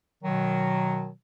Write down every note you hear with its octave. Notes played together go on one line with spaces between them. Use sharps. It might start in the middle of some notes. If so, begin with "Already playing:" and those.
B2 D#3 F#3